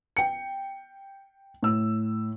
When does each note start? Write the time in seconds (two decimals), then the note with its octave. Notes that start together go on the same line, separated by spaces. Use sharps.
0.17 G5 C#7
1.63 A2 E6